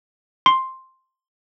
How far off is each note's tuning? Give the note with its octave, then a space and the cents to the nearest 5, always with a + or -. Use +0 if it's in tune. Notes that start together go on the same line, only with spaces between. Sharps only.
C6 +5